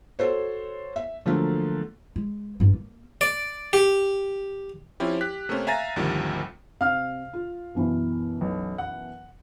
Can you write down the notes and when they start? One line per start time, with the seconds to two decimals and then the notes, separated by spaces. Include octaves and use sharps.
0.19 F#4 A4 C5 C#5
0.96 E5
1.26 D3 F3 F#3 A3 A#3
2.16 G#3
2.60 G2 D4
2.73 A#3
3.21 D5
3.73 G4
5.00 F3 C4 C#4 E4 G4
5.21 G4 F#6 B6
5.49 C3 A3 A#3 C4 C#4
5.67 E5 F5 G#5 A#5 A6 A#6
5.96 G#1 D2 C3 D#3 F3 G3
6.81 C3 F5 F6
7.33 F4
7.75 F#2 B2 E3
8.41 B1
8.78 F#5